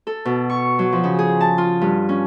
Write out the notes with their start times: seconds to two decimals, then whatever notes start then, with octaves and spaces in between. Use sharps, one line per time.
0.07 A4
0.25 B2
0.50 C#6
0.79 F#3
0.92 F3
1.04 C#3
1.19 G#4
1.40 A5
1.58 F4
1.81 G2
2.09 C#4